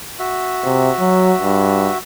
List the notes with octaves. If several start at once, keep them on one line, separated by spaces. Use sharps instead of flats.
F#4 E5
C3
F#3
G2